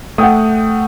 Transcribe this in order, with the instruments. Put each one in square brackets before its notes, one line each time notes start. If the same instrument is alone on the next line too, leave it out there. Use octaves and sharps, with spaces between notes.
[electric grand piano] A3 [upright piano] F#5 G5 D#6